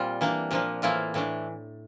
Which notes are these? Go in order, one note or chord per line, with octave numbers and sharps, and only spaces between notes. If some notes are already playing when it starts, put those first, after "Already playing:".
Already playing: A#2 G3 C4 F4
E3 A#3 D4
A#2 F3 A#3 D4
A2 E3 A#3 E4 F4
A2 E3 A3 D4